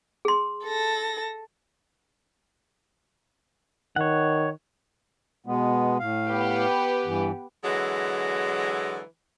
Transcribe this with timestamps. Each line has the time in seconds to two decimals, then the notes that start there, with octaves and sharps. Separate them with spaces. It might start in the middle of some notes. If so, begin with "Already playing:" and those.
0.25 G#4 C6
0.65 A4 A#6
3.96 D#3 C#5 F#5
5.46 B2 G#3 B3
5.99 A2 F5
6.28 B3 G4 B4
7.05 G2 E3
7.64 D3 E3 F#3 G#3